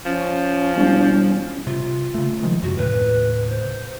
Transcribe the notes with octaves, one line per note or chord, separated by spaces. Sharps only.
F3 C#4
E1 G3
C3 F4
C#3 A3
D#3 F3 G#3
F#2 C3 F#4
D#2 A2 C#3 B4
C5